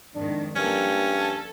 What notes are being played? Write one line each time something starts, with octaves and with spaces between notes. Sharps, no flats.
F2 G#2 D#3 D4
G2 F3 A#3 C#4 A4
A4